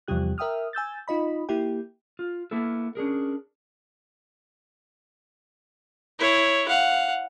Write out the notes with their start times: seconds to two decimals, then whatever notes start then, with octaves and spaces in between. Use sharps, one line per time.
0.08 E2 C3 F3 G3 G4 F#6
0.38 A#4 E5 G5 D#6 F6
0.73 G#5 E6 G6 A6
1.08 D#4 F4 D#5 B5
1.49 A#3 E4 G4 G5
2.19 F4
2.51 A#3 B3 E4 A4
2.95 C#4 D4 G#4 A#4
6.19 E4 C#5
6.68 F5 F#5